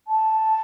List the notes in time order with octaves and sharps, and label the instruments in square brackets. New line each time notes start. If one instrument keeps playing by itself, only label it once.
[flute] A5